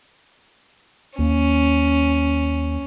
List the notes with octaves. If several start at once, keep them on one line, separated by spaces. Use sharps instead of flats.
D#2 A#3 C#4